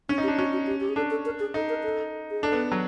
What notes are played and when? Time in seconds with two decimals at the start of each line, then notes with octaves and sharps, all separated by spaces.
0.09 C#4 D4
0.18 D#4
0.23 G4
0.28 D4
0.38 C#4 F#4
0.53 F#4
0.67 G4
0.80 G4
0.89 G#4
0.96 D4 A4
1.11 A4
1.26 A#4
1.40 G#4
1.54 D#4 A4
1.69 A#4
1.84 A4
2.31 G#4
2.43 D4 A4
2.52 B3
2.72 F#3